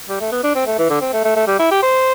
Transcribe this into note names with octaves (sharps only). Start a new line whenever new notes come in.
G3
A3
B3
D4
C4
A3
E3
D3
C4
A3
A3
A3
G3
E4
G4
C5